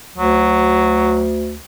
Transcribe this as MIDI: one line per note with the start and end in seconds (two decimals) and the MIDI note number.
0.18 1.57 38
0.18 1.23 54